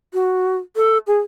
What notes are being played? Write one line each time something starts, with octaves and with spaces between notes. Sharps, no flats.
F#4
A4
G#4